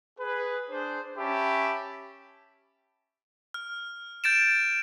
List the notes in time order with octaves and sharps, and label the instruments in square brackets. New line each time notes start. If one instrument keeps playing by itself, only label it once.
[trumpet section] G#4 B4
D4 G#4 C5
C#4 G4 E5 A5 B5
[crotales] F6
G6 A6 D7 E7